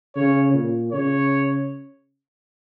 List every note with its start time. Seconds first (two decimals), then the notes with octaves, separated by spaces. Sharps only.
0.16 C#3 C#5
0.54 A#2
0.92 C#3 C#5